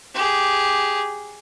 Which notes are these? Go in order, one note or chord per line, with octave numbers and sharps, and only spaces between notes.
G4 G#4